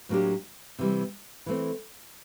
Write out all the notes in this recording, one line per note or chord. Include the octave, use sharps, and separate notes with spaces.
A2 F#3 A#3 D4 G4
C3 E3 G3
E3 A3 C4